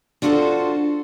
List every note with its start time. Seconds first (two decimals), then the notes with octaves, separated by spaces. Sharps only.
0.22 D4 F4 F#4 G#4 A4 C5